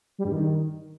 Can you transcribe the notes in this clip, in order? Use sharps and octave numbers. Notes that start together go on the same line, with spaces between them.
G3
G2
D#3